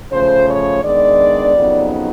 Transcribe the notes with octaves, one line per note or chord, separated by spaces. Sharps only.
C#3 F3 A3 C5
C#5
D#3 G#3 B3 D4 D5
F2 C#3 F#3 B3 D#4